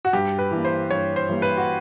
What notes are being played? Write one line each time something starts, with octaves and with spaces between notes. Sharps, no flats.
F#4
G2 G4
B4
E3 G3 A#3
C5
G2 C#5
C5
E3 G3 A#3
B4
F#4